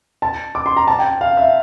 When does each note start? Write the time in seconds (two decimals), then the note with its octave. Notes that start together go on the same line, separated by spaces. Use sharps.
0.22 A5
0.55 D6
0.66 C6
0.77 A#5
0.88 A5
0.99 G5
1.21 F5
1.37 E5